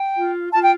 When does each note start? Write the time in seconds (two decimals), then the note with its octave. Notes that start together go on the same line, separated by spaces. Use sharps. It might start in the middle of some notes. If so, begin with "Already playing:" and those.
Already playing: G5
0.15 F4
0.53 F4 A5
0.61 G5